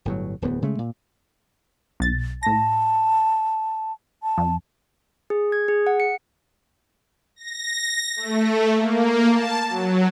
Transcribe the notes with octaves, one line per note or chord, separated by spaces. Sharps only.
G1 A2 F#3
D1 E2 B3
C#3 G#3 A3
A#2
B1 A6
A2 A5 A#6
A5
F2
G#4
G#6
G#4
F#5
C#7
A#6
A3
A#3
A5
F#3